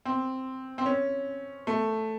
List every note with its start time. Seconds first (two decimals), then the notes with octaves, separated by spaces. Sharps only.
0.05 C4
0.78 C4
0.86 C#4
1.67 A3